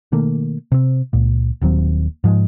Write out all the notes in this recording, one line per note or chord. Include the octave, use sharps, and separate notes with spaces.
B2 D#3 A3 A#3
C3 C4
C#2 A#2
D#1 D#2 F#3 C4
G#2 F3 G3 G#3